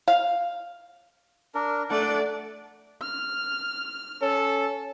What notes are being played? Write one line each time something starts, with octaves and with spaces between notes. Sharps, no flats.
F5
D4 A#4
A3 D4 D5 F#5
F6
C#4 A4